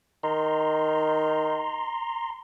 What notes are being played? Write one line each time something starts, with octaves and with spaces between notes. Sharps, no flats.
D#3 A#5 C6